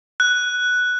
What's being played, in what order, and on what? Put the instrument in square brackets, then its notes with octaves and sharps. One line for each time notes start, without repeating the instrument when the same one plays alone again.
[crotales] F#6